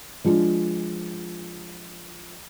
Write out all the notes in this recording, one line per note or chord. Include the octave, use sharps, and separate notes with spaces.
F3 G#3 D4 F4